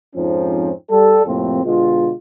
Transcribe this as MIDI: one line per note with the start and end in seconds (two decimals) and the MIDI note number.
0.16 0.71 41
0.16 0.71 44
0.16 0.71 53
0.16 0.71 60
0.16 0.71 61
0.16 0.71 63
0.90 1.25 55
0.90 1.25 69
1.25 1.61 41
1.25 1.61 45
1.25 1.61 48
1.25 1.61 53
1.25 1.61 58
1.25 1.61 60
1.65 2.12 47
1.65 2.12 50
1.65 2.12 56
1.65 2.12 65